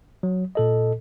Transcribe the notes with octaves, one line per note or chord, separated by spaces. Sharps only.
F#3
A#2 A4 D#5